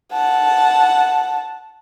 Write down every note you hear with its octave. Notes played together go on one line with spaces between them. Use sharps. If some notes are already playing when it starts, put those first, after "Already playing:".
F#5 A5